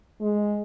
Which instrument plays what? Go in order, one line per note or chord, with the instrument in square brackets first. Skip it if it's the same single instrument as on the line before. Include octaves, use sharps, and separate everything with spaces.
[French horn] G#3